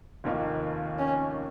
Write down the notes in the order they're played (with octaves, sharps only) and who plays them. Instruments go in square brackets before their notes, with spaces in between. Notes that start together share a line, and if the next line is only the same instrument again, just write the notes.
[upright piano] F1 D#2 D#3 A#3 F4
[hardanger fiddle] C#4